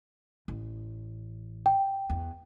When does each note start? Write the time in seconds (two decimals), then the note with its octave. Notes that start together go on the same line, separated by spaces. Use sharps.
0.48 A1
1.66 G5
2.10 E2